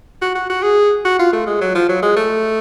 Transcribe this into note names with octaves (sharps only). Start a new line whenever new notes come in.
F#4
F#4
F#4
G#4
F#4
F4
A3
G#3
F#3
F3
F#3
G#3
A3